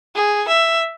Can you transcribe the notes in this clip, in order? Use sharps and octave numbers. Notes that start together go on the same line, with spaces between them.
G#4
E5